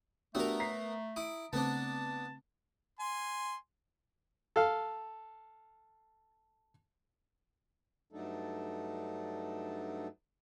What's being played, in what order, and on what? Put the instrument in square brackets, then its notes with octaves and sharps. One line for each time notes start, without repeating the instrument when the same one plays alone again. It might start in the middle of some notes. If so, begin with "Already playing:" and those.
[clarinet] A3 [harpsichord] B3 A#4 [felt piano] D4 F#4 G4 [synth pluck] E6
[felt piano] A#5 B6 C7
[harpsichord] E4 [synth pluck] D#6 D7
[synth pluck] C#3 A3 C4 [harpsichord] B3 D4 [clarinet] A5
[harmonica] G#5 C6
[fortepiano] A4 F5
[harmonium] G2 F#3 A3 D4 D#4 A4